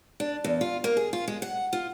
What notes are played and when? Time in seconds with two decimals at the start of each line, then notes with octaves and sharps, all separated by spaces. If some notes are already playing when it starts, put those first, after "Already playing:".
0.20 D4
0.44 E2
0.61 F4
0.84 A#3
0.97 G#4
1.13 F4
1.28 G#3
1.42 F#5
1.73 F4